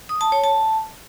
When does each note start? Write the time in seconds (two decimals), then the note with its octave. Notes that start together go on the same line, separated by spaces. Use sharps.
0.09 D#6
0.21 A5
0.32 C#5
0.44 A5